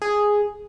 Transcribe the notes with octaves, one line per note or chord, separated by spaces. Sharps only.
G#4